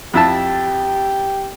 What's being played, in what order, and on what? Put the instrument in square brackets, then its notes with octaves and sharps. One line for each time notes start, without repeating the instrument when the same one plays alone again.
[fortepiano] F2 E4 A5 [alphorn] G4